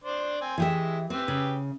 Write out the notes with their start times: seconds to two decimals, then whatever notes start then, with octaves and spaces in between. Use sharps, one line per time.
0.04 D4 C5 D5
0.41 C4 G#5
0.58 E3 G#3 E4 G4 E5
1.10 C4 G4 B4 E6
1.28 C#3